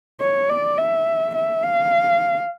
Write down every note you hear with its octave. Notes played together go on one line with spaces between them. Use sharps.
C#5
D5
E5
E5
F5